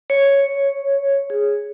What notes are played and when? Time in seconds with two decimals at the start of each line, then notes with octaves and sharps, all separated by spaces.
0.10 C#5
1.30 G#4